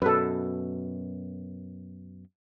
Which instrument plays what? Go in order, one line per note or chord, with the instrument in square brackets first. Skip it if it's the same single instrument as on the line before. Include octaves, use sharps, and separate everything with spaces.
[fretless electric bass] F#2 B2 [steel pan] A4 B4